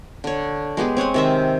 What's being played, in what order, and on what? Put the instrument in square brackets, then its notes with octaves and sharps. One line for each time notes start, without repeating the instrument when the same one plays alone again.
[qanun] D3 C#5
G#3 B3 G4 G#4
C4 C#5 F#5 G#5
C3 D#3 E5